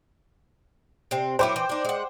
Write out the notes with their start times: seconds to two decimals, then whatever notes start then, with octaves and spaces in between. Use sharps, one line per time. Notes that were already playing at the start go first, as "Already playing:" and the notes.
1.11 C3 C4
1.39 F#3 E4 A#4 C5 G5 D6
1.56 E3
1.69 D4 D#4
1.85 G#3 F#5